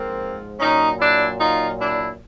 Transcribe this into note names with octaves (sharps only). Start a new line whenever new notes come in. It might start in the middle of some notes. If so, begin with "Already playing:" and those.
Already playing: G#2 F3 A#3 C4
A#2 F#3 C#4 D#4
D4 E4
D#4 F4
D4 E4